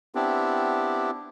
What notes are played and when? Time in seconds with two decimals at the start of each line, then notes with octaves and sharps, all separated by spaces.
0.15 B3 C4 D4 E4 G4